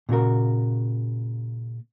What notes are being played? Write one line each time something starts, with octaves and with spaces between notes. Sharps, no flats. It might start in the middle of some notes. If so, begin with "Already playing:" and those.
A#2 C#3 F#4 A#4